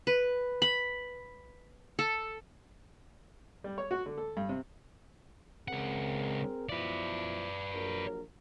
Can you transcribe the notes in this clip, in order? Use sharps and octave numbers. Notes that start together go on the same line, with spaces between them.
B4
B5
A4
G3
C#5
F#4
D3
A4
G2
C3
C#2 C4 G#4 A#4 F#5
B2 F3 E4 B4 D5
A#1 F#3 A#4